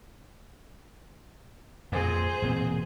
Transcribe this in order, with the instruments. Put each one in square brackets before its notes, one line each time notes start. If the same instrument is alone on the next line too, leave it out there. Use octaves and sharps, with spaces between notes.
[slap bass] F2 A#2 [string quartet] G#4 C5
[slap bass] E1 A#2 C4